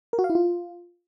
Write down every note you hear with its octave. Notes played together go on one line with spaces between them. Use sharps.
A#4
F#4
F5
E4
F4